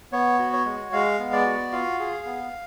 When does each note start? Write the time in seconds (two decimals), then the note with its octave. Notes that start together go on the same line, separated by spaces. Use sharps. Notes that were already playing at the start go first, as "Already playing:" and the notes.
0.12 B3 C#5
0.39 F#4
0.53 C#5
0.65 G#3
0.92 G#3 F5
1.19 B3
1.32 D5
1.46 F#4
1.72 F4 F5
1.99 G#4
2.26 B3